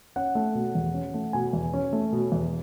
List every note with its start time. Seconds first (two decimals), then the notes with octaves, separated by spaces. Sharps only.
0.16 C#4 F#5
0.35 A3
0.55 B2
0.75 E2
0.94 C#4
1.14 A3
1.33 B2 G#5
1.53 E2
1.74 C#4
1.93 A3
2.13 B2
2.32 E2